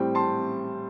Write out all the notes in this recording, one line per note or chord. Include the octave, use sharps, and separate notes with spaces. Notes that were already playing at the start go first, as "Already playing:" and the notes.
Already playing: A2 G3 C4 G5
A5 C6